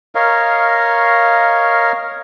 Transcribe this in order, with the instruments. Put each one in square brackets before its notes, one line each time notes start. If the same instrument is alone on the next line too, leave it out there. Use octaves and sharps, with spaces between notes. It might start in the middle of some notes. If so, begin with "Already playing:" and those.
[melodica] A#4 C#5 D#5 F5